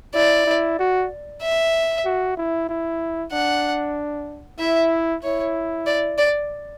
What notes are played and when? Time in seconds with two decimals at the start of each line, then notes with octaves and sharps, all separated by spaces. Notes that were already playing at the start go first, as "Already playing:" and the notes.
0.14 E4 D5
0.46 E4
0.79 F#4
1.42 E5
2.05 F#4
2.37 E4
2.69 E4
3.32 D4 F#5
4.59 E4 E5
5.23 E4 C#5
5.86 D5
6.18 D5